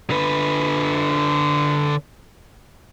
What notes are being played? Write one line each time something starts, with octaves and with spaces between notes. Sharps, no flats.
D3 B4